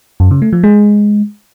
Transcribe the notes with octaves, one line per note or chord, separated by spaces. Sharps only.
F#2
C#3
A3
F3
G#3